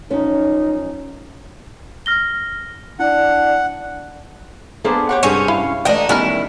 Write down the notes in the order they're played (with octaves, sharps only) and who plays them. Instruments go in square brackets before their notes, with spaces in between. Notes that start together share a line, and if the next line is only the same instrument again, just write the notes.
[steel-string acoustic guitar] F#2 F3 C#4 [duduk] D#4
[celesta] F6 A#6 G7
[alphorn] D4 [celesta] E4 [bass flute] D5 [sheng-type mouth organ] F#5
[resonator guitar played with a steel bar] A#3 D4 A4 [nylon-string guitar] B3 G#4 C5
[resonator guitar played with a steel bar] G4 C#5 F#5
[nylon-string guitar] G2 C3 [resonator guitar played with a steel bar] C4 G#4 A4 [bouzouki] C#4 C#5
[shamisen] E4 [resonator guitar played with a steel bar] F5
[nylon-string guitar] E3 A3 [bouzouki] D4 D#4 [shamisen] D5 G5
[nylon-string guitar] D#3 G3 [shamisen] B3 C#4 A#4 [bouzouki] E4